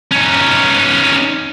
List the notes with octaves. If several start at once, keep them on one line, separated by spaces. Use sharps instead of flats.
C#4 D#4